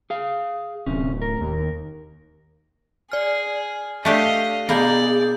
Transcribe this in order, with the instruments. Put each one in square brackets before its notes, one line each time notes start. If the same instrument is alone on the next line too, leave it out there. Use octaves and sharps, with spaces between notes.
[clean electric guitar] G#4 F5
[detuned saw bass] D1 [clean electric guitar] F#2 C3 C#4
[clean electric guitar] A#4
[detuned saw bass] D#2
[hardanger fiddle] G#4 [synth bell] D5 F6
[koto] A3 D4 G4 [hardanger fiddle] D#5 F5
[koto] B2 A#3 A#4 [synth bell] B3 B5 G6 [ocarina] G#4 [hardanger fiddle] D5